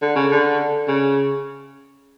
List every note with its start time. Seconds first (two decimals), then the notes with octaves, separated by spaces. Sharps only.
0.02 D3
0.15 C#3
0.31 D3
0.88 C#3